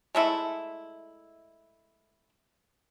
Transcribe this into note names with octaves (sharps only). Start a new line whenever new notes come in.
G#3 A3 E4